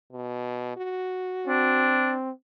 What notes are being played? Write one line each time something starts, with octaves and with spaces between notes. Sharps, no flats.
B2
F#4
C4 D4